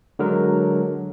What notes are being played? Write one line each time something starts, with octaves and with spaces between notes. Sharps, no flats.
D3 F#3 G#3 A#4